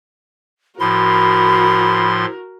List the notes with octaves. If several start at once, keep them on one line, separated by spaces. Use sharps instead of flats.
A2 F3 F#4 A#4 B5 C6